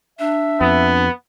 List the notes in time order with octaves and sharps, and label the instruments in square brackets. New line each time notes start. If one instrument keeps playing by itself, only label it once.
[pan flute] D4 [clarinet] E5
[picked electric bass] F2 [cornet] B3